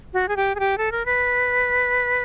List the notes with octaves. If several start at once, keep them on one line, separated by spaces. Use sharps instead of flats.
F#4
G#4
G4
G#4
G4
A4
A#4
B4